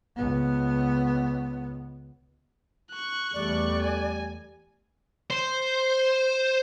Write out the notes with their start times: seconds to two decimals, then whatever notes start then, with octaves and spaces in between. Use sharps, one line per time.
0.16 C#2 B3
2.90 C#6 F#6
3.34 E2 G3 A3 D5
3.82 G#5
5.30 C5